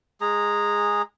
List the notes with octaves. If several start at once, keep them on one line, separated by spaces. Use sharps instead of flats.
G#3 G#4 A#5